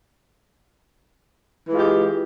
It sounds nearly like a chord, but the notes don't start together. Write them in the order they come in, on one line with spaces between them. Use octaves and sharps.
E3 G#3 F4 G4